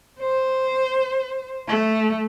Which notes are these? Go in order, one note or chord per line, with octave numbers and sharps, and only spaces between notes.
C5
A3